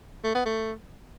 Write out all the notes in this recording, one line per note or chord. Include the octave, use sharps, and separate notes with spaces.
A3
B3
A3